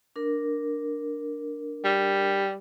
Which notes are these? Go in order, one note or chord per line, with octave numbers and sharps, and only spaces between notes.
D4 A#4
G3